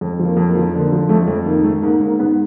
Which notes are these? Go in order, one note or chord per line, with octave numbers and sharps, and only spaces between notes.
F2
F3
A#3
F2
A#3
F3
D3 A#3
F3
F2 A3
F2
D#3 A#3
G#2 A3
G#2 A#3
G#2 A#3
G#2 B3